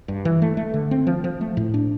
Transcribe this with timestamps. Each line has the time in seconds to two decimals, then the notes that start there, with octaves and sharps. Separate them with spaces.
0.08 G2
0.25 E3
0.42 A3
0.57 A3
0.74 D3
0.91 C4
1.07 F3
1.24 F3
1.41 A3
1.57 A2
1.74 D4